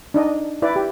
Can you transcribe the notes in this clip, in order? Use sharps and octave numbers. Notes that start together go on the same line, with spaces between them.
D4 D#4 D#5
E4 B4 D5
G4